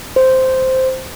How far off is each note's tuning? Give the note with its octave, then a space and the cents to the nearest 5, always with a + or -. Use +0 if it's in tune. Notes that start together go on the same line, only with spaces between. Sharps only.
C5 -5